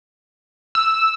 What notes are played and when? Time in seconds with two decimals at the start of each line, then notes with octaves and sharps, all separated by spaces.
0.75 E6